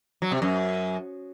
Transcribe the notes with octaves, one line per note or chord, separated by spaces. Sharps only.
F#3
C3
F#2